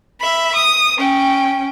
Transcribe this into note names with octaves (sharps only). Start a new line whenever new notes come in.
E5 B5
D#6
C#4 G5